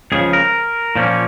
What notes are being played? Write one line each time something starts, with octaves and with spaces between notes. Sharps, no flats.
C#2 C#3 F3 G#4
A#4
A#2 F3 A#3 C#4